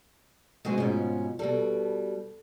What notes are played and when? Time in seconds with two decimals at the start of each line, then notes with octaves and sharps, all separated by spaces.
0.65 F#2 B2 G#3 C4 F#4 G#4
0.78 G#2 B2 F3 C#4
1.39 B2 G3 A4